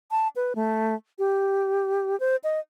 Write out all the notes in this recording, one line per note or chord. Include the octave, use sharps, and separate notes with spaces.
A5
B4
A3
G4
C5
D#5